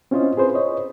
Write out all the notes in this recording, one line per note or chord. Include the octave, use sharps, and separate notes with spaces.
C4 C#4 E4 F4 C5 D#5
G#4 B4 C5
C#5 D#5